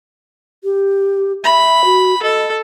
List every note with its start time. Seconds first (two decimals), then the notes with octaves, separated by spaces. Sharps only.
0.63 G4
1.44 E5 B5
1.84 F#4
2.23 A4 D#5